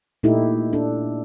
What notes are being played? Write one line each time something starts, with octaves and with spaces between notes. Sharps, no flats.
A#2 A3 D#4 E4 G4
D4 A4